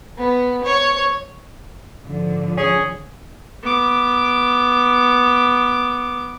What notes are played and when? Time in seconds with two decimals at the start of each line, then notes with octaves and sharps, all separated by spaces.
0.18 B3
0.64 C#5
2.04 G#2 D3 F3
2.58 C#4 G#4
3.63 B3 D6